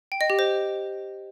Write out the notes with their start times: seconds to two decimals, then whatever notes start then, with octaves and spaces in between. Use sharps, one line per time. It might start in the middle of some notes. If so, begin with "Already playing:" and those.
0.12 G5
0.21 D#5
0.30 G4
0.39 C5